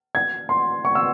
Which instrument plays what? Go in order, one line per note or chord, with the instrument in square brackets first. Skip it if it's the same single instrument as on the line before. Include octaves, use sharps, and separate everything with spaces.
[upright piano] G#6
C6
C#6
E6